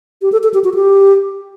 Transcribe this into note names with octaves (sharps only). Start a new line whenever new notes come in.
G4
A4
A4
G4
F#4
G4